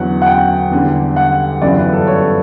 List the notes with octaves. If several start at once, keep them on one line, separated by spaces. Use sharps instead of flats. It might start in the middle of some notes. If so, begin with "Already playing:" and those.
Already playing: E2 D3 F#3 F#5
F#5
G5
E2 D3 G3
F#5
G1 F#2 E3 G3 D5
B4
A4
C#5